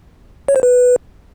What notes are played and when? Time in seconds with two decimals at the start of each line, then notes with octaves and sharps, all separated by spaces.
0.48 C#5
0.56 C5
0.63 B4